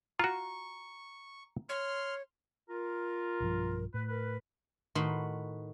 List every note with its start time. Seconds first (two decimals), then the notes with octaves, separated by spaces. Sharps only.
0.19 F4 F#4 A#5 C#6
1.69 C#5 C6 F6
2.70 F4 A#4
3.40 B1 G2 F3
3.94 A2 B4
4.08 A#4 B4
4.95 A2 D#3 F#4 B4 B5 C6